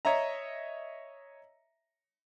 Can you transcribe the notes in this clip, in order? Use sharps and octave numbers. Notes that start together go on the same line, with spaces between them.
C#5 D#5 E5 A#5